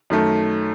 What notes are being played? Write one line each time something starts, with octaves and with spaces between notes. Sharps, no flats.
F#2 D#3 A3